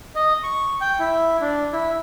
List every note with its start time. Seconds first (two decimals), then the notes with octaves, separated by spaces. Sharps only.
0.15 D#5
0.43 C#6
0.81 G5
0.99 E4
1.41 D4
1.73 E4